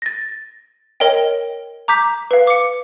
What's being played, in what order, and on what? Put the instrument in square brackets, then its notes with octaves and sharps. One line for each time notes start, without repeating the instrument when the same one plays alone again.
[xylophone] A6 A#6
A#4 C#5 D#5 G5
A#5 D6 G6 B6
B4 F5
D6 C#7